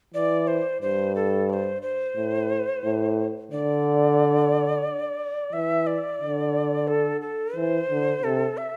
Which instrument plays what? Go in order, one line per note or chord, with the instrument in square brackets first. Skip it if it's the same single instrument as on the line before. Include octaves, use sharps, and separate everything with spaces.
[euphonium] E3 [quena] D5
[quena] C5
[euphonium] G2 [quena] C5
[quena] A4
D5
C5
C5
[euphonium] A2
A2
[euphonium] D3 [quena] D5
[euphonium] E3 [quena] E5
[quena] D5
[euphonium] D3
[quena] A4
A4
[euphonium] E3 [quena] C5
[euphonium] D3
[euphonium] C3 [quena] A4
[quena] E5